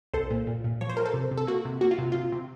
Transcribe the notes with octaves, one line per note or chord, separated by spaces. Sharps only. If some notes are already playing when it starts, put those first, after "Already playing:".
C2 A4 C5
A#2
A#2
A#2
F3 C#5
C5
F3 A#4
A4 C5
C3
C3
A4
A#3 F#4
C3
A#3 F#4
F4
C3
C3 F4
C3